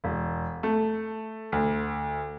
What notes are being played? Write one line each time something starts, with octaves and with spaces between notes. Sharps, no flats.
E1
A3
D2